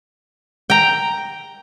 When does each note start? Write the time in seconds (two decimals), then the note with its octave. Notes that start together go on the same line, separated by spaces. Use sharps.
0.70 G5 A#5